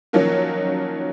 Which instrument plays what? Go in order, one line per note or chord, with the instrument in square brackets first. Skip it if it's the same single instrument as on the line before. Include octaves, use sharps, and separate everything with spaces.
[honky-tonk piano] D#3 F3 F#3 A#3 C#4